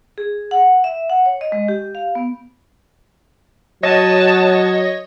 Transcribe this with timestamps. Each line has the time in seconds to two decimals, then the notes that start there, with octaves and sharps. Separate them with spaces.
0.18 G#4
0.51 F#5
0.84 E5
1.10 F#5
1.26 C#5
1.41 D#5
1.52 G#3
1.68 G4
1.95 F5
2.15 B3
3.83 F#3 F#4 C#5 D#5 A5